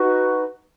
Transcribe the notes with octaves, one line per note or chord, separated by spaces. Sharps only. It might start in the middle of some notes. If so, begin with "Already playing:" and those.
Already playing: D#4 F#4 B4 C#6